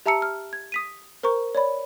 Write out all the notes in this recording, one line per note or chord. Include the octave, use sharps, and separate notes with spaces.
G4 E5 A5 A#5 E6 C#7
F6
G#6
D#6 B6 D#7
A#4 C5 A#5 C#6
C#5 D5 B5